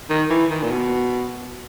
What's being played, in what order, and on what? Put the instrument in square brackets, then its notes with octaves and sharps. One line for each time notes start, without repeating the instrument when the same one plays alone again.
[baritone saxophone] D#3
E3
D#3
A#2
B2